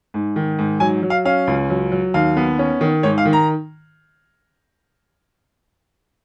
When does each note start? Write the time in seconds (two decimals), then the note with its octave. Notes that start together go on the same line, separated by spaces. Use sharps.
0.14 G#2
0.36 D#3
0.59 G#2
0.80 F#3 G#5
1.03 F#3
1.10 F5
1.25 C#4 F5
1.47 C#2
1.70 F#3
1.92 F#3
2.14 D#2 F5
2.37 B3
2.59 C#4
2.81 D#3
3.03 G#2 C#5
3.18 F5
3.25 D#3
3.33 A#5